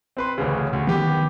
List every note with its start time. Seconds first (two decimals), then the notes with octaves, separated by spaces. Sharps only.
0.17 C4 B4 C6
0.38 A1 D2 C#3
0.73 D2
0.87 D#3 B3 G4